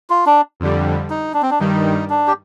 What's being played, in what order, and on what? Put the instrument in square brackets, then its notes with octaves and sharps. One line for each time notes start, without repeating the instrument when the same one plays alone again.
[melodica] F4
D4
[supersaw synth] F2 D3 G3
[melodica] D#4
D4
C4
D4
[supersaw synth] G2 D#3 G3 [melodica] D#4
[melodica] D4
G4